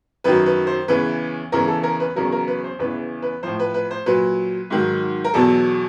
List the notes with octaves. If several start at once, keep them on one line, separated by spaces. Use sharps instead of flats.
F#2 D#3 F#3 B4
B4
C5
E2 C#3 E3 B4
E2 C#3 E3 A#4
A4
A#4
B4
E2 C#3 F#3 A#4
A#4
B4
C5
E2 C#3 E3 B4
B4
A2 F3 C5
B4
B4
C5
A#2 F#3 B4
G#2 D#3 F#3
A#4
E2 B2 F#3 A4